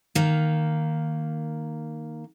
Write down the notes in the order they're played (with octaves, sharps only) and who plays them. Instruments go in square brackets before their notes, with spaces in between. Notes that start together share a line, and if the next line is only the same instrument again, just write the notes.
[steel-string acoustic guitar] D#3 A#3